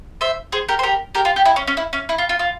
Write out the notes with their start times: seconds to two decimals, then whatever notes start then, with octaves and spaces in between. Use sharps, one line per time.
0.21 C5 E5
0.52 G#4 C5
0.69 G4 A#4
0.79 C5
0.83 G4 A#4
1.15 G4 A#4
1.25 F4
1.36 G4
1.46 E4
1.56 C#4
1.67 C#4
1.77 E4
1.93 C#4
2.09 E4
2.18 F4
2.29 F4
2.39 F4